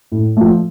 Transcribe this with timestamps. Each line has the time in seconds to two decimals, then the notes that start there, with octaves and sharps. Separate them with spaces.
0.12 A2
0.37 F3 A3